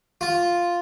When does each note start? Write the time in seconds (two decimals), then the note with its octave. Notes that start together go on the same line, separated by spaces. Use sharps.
0.21 F4